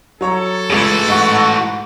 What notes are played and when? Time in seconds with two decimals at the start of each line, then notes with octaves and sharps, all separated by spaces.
0.21 F#3 A4 C#5 A#5
0.70 C#2 A2 E3 G#4
1.07 G#2 D#4 F#4